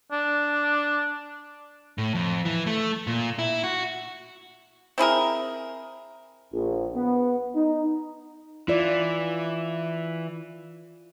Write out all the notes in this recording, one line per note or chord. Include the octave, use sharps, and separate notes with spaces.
D4
A2
F2
E3
A3
A#2
E4
F#4
C4 E4 G#4 A#4
A#1
B3
D#4
E3 F4 D5